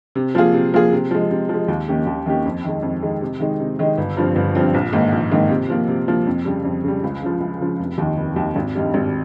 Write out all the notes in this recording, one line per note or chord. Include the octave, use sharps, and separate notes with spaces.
C3
F3 A#3 F4 G#4
C3
F3 A#3 F4 G#4
C3
F3 G#3
C3
F3 G#3
D#2
D#3 A#3 C#4 G4
D#2
D#3 A#3 C#4 G4
F2
D#3 G#3
F2
D#3 G#3
C3
D#3 G#3 D#4
C3
D#3 G#3 D#4
G1
G2 F3 C4
G1
G2 F3 C4
A#1
G#2 D#3 A#3
A#1
G#2 D#3 A#3
C3
F3 A#3
C3
F3 A#3
F2
C#3 G3
F2
C#3 G3
C#2
C#3 F3
C#2
C#3 F3
F1
D#2 D#3
F1
D#2 D#3
G#1
G2 D#3 G3
G#1